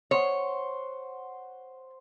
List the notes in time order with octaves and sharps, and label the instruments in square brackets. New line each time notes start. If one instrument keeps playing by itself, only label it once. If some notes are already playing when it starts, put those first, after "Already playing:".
[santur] C5 F#5 C6 [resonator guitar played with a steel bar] C#5